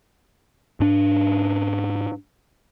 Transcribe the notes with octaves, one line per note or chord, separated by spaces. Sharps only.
G#2 D4